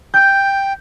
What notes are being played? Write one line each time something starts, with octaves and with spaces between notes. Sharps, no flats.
G5 G6